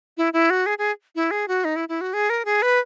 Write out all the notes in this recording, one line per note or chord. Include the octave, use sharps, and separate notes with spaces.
E4
E4
F#4
G#4
G#4
E4
G#4
F#4
D#4
E4
E4
F#4
G#4
A#4
G#4
B4